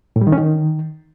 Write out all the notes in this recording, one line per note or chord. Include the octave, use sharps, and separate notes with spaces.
A2
G3
D#3
C#4
D#3